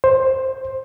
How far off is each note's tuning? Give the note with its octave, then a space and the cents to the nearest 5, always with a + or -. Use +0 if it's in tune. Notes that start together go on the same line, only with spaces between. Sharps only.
C5 +10